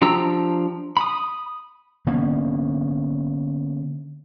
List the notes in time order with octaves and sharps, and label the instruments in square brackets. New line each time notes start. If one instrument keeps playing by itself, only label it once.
[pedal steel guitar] F3 D4 G4 A#5 E6
B5 D#6
[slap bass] D3 A#3 B3 C#4